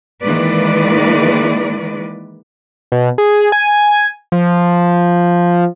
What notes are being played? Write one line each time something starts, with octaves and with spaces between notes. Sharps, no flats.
D#3 E3 G#3 A#3 B4 D5
B2
G#4
G#5
F3